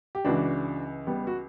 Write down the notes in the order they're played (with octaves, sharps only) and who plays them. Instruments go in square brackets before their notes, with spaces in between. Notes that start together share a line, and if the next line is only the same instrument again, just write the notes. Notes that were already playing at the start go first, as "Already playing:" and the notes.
[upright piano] G4
C#2 C#3 E3 D4 F#4
G3 B3
F#4